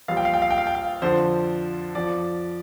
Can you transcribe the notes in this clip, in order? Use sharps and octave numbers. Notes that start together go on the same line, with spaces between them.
A#1 A#2 G3 F5
G5
F5
G5
F5
G5
F5
G5
F5
F2 D3 F3 C5
F2 F3 D5